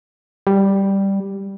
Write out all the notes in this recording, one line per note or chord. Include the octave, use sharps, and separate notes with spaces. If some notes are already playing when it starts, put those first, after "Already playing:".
G3